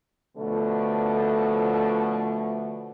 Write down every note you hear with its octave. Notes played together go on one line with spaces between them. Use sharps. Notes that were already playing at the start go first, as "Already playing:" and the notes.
B2 D3 F3 A3